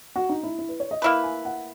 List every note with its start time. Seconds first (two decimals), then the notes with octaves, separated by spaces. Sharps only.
0.16 F#4
0.29 D#4
0.43 E4
0.59 E4
0.69 B4
0.80 C#5
0.91 D#5
1.02 A#3 E4 B4 E5
1.23 G#5
1.45 F#5